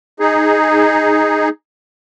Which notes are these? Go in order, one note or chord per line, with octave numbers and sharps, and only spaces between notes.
D#4 G#4